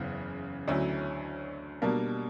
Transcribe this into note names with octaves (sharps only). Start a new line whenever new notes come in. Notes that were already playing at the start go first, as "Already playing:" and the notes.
Already playing: F#1 E2 C#3 E3
D2 D3 F#3 C#4 E4
B2 G3 A#3 D4 A#4